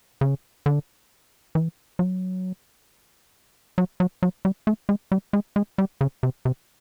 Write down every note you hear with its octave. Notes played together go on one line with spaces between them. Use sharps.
C#3
D3
E3
F#3
F#3
F#3
F#3
G3
A3
G#3
G3
G#3
G#3
G3
C#3
C3
C3